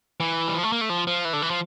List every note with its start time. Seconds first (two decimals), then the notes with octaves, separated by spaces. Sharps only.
0.20 E3
0.48 G3
0.55 F3
0.63 A3
0.72 A#3
0.81 A3
0.90 F3
1.07 F3
1.25 E3
1.33 D3
1.42 E3
1.50 F3